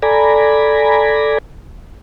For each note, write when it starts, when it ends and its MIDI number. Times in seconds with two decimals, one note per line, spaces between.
0.03 1.38 69
0.03 1.38 74
0.03 1.38 80
0.03 1.38 82
0.03 1.38 83